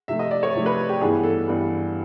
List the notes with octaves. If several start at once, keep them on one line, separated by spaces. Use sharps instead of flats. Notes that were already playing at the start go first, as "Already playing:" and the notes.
C3 F3 A3 E5
D#5
D5
C#5
C3 F3 A3
B4
G4
G2 E3 G3 B3 G#4
A4
G2 E3 G3 B3